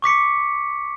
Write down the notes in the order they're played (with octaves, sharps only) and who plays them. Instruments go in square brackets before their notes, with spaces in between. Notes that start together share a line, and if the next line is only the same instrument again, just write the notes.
[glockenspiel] C#6 D6 B6 C#7